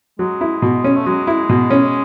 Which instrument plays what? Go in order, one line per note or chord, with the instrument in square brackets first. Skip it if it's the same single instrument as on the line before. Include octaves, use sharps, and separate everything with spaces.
[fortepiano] F#3 [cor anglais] G#3
[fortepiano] E4
B2
C#4
[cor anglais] A3
[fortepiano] F#3 [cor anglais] G#3
[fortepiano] E4
B2
C#4